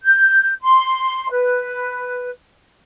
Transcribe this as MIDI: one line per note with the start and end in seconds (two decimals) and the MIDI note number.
0.03 0.52 91
0.61 1.29 84
1.30 2.30 71